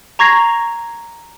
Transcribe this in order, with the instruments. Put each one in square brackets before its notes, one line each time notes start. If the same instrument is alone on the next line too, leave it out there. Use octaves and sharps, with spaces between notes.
[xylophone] A#5 C#6 G#6 A#6 C7 F7